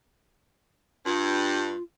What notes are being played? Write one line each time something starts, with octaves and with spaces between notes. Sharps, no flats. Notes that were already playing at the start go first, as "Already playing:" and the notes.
G2 F4